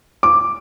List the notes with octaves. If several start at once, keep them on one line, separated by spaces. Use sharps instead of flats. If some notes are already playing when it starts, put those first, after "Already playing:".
D6